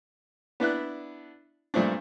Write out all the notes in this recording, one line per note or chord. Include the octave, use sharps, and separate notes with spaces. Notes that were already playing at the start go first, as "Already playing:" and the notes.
B3 D4 E4 F#6
G2 A#2 A3 C4 D4